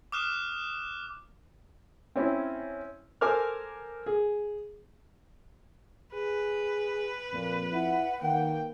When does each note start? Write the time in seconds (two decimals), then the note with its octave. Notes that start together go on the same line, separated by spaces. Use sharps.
0.12 D6 D#6 F6 F#6 E7
2.16 C4 C#4 E4
3.21 A4 A#4 C5 G#5 D6 F6
4.06 G#4
6.14 G#4 B4
7.33 F2 A#2
7.73 E4 F#5
8.22 D#3 A#3 G5